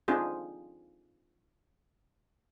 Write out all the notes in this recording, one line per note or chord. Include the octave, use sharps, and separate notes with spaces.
C4 D4 D#4 F4 G#4